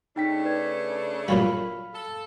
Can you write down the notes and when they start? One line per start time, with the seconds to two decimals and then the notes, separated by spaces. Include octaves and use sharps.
0.16 C#3 A3 D4 D#4 G5 B6
0.45 B4 D5 G#6
1.28 A#2 F#3 G3 F5 B5
1.93 A4